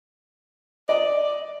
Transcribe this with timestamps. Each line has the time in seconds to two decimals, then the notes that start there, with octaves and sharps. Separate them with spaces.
0.89 D5 D#5